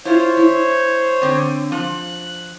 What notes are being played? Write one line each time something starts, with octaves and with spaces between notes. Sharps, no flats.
E4 F4 C5 C#5
E4
D3 C4
F3 F#6